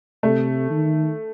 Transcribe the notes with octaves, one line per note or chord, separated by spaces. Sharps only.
C3 A3
D#3